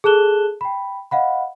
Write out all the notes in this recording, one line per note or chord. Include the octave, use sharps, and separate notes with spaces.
G#4 A4 A5 F#6 E7 G7
G5 B5
D#5 F5 F#5 B5